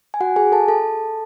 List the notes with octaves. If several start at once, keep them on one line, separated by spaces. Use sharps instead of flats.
G#5
F#4 F#5
G#4 G#5
A4 A5
A4 A5